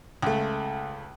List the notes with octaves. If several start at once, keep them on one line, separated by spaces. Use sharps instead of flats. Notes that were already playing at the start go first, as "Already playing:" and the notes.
C#2 A3